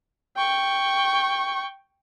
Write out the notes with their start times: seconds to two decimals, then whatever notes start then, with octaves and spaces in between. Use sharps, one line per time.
0.37 G5 C#6